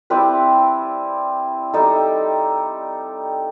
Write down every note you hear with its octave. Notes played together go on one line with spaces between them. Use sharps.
G3 C4 E4 B4
G3 D#4 A4